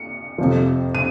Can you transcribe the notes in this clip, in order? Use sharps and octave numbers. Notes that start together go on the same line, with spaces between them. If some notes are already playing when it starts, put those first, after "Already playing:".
Already playing: C#7
F2 C3 F3
D#7